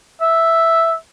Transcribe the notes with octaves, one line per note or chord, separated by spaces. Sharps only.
E5